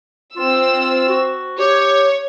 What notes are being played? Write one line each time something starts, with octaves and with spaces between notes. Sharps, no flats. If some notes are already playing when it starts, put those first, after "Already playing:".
C4 F4 E6
F#4
G4 C#5